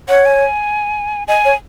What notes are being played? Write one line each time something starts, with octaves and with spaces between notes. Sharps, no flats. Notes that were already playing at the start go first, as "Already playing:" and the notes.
C#5 F#5
G#5
D#5 G#5
C#5